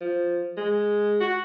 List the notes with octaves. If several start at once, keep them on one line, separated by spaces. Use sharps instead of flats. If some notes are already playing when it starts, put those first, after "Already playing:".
F3
G#3
F#4